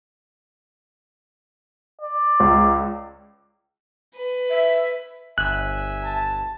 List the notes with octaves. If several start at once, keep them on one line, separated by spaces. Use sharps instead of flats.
D5
C#2
B4
E5
G1 E5 G#5 F#6
A5